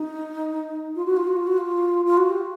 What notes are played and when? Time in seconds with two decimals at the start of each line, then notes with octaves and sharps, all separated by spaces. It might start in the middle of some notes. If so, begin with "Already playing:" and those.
Already playing: D#4
0.96 F4
1.06 F#4
1.17 F4
1.27 F#4
1.36 F4
1.47 F#4
1.58 F4
2.06 F4
2.17 F#4
2.30 G4